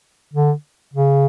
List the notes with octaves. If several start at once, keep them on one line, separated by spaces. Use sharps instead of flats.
D3
C#3